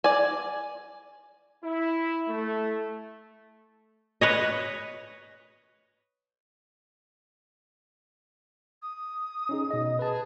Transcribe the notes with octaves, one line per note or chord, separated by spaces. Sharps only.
D5 G#5
E4
A3
B4 C#5 D#5
D#6
C#4 D#4 G#4
B2 D#5
G#4 B4 A5